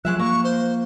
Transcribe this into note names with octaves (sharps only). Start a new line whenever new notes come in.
F3 F#3 G#3 E5 F#6
A#3 C#6
C5